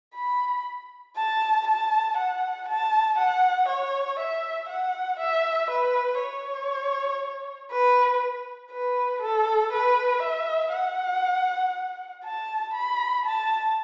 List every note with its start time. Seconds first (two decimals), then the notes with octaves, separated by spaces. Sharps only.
0.16 B5
1.17 A5
1.67 A5
2.17 F#5
2.68 A5
3.18 F#5
3.69 C#5
4.19 E5
4.69 F#5
5.20 E5
5.70 B4
6.21 C#5
7.72 B4
8.71 B4
9.22 A4
9.72 B4
10.23 E5
10.74 F#5
12.25 A5
12.74 B5
13.26 A5